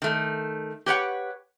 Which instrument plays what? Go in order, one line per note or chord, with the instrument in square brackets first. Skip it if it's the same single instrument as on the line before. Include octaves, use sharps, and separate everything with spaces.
[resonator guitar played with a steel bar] D#3 A3
G4 B4 C#5 F#5